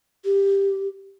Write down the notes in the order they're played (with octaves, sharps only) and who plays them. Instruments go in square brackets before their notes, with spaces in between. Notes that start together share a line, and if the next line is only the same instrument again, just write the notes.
[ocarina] G4